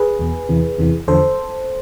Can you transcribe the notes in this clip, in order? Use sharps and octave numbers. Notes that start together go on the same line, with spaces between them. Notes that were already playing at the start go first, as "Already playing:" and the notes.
Already playing: G#4 B4
E2 B2
E2 C3 E3
E2 C3 E3
E2 D3 F3 A4 C5